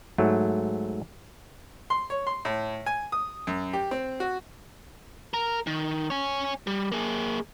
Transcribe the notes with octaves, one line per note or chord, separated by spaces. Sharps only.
G#2 F#3 A3
C6
C#5
C6
A2
G#5
D#6
F#2
G4
C4
F#4
A#4
D#3
C#5 G#5
G3
A#3 G#4